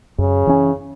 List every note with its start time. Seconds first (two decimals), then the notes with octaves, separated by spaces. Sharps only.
0.18 F#2 C#3
0.47 E3 C#4